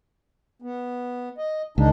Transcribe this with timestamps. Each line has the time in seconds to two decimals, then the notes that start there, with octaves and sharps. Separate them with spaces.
0.62 B3
1.38 D#5
1.78 C#2 D#3 D4 D#4